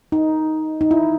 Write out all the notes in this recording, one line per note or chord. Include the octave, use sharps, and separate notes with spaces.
D#4
D#4
E4